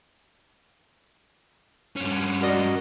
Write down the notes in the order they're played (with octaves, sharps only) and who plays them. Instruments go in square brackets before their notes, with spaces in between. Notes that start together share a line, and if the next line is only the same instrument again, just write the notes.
[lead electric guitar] G2 C#4
[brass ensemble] F#4 [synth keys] A#4 D5 D#5